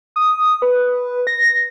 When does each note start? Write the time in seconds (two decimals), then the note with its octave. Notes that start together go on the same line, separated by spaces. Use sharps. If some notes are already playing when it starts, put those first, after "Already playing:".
0.16 D#6
0.62 B4
1.27 A#6